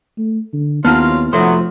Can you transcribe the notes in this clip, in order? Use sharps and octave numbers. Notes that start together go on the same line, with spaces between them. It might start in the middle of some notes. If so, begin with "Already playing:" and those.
A3
D3
D#2 F#3 B3 C4 E4 F4 A5 F6
F1 F3 F#3 A3 B3 C5